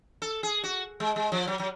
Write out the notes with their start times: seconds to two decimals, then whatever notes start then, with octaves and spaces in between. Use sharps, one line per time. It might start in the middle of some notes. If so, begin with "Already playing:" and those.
0.22 A4
0.43 G#4
0.64 F#4
1.00 G#3
1.16 G#3
1.32 F3
1.47 F#3
1.59 F#3